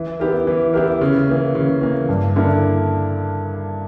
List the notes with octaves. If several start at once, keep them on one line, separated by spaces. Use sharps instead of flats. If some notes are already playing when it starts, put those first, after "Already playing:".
Already playing: E3
B3 E4 G4 A#4
E3
B3 E4 G4 A#4
C#3
E3 A#3
C#3
E3 A#3
G2
D3 A#3 E4 A#4